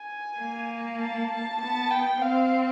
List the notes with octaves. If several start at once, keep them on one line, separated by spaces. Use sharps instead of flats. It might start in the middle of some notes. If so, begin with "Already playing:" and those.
Already playing: G#5
A#3
A5
A5
B3 A5
G5
C4 F5